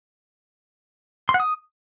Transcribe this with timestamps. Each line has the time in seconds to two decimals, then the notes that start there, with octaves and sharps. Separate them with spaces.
1.29 C6
1.34 F#5
1.40 D#6